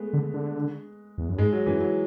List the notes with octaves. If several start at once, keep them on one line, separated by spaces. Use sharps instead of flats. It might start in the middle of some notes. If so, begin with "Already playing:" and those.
Already playing: G#3 A3 B3
D3
D3
E2
F#2
G#2 G#3
F#3
F#2 E3
F#3